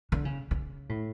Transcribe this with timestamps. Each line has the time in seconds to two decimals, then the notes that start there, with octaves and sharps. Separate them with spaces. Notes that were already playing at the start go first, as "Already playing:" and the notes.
0.12 D3
0.25 C#3
0.51 C#3
0.89 A2